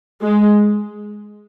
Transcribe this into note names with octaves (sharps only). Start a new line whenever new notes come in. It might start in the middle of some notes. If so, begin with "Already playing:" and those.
G#3